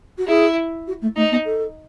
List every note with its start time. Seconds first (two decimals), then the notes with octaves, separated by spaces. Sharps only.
0.18 F#4
0.28 E4 G#4
0.87 F#4
1.02 A3
1.16 A3 D#4
1.31 B3
1.45 A4